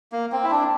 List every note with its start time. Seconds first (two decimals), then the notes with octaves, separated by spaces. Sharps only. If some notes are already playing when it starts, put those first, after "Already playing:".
0.12 A#3
0.32 C4
0.44 E4
0.50 D4